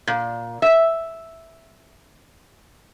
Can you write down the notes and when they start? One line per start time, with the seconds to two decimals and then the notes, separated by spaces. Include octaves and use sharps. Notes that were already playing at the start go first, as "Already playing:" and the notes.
0.07 A#2
0.62 E5